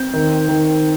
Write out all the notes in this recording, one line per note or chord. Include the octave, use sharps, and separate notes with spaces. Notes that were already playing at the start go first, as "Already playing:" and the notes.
Already playing: C4 G6
D#3
D#3